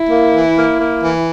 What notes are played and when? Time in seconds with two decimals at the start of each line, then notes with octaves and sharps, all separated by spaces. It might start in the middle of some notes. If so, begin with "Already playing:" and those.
Already playing: E4
0.09 A#3
0.32 E3
0.56 A#3
0.78 A#3
1.02 E3